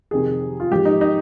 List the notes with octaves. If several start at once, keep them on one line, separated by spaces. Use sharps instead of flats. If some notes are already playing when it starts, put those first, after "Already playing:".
F2 C3 D#3 G#4
F4
G#2 F3 G4
D#4
D#4